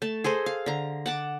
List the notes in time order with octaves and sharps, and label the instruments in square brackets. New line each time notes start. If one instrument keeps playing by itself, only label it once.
[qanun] A3 A5
G#4 A4 C5 D#5
F5
D3 A#5
F#5 A5 D6